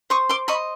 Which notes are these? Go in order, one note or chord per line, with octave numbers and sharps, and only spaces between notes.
C5 C#6 D#6
C6 D6
D#5 B5 C#6